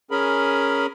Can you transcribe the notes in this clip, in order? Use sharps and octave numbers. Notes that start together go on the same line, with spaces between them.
C#4 G#4 A#4 B5